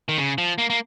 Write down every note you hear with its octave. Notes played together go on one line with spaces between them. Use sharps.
D#3
C#3
F3
A#3
A#3